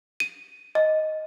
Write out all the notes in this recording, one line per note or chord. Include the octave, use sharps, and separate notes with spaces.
D#7
D#5